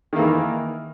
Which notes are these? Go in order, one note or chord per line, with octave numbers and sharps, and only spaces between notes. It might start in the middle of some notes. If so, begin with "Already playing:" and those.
D#3 E3 A#3